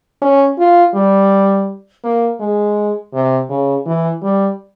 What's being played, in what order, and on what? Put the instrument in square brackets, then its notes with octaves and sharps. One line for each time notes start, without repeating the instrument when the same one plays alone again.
[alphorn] C#4
F4
G3
A#3
G#3
C3
C#3
E3
G3